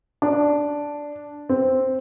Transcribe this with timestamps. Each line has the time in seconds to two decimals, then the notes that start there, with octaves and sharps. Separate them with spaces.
0.22 D4
1.49 C4